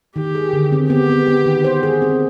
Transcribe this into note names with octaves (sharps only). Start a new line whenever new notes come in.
D#3 G4
G#4
D3
C4
B3 G4
B3
B3
D#3
C5
G#4
C4